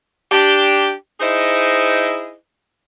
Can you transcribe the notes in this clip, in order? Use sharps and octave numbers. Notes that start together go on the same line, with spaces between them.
D4 G4
D#4 E4 G#4 C5 D#5